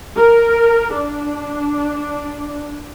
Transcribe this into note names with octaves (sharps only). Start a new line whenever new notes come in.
A#4
D4